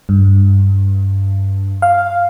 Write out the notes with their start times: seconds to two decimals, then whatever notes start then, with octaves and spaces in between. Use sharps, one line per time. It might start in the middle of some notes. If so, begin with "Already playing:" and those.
0.09 G2
1.82 F5